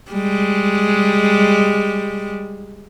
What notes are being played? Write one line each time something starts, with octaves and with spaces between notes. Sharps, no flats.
G3 G#3